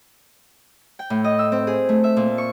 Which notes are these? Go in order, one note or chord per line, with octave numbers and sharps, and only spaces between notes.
G5
A2
D#5
E6
C4
G#4
A3
E5
A#2
C#6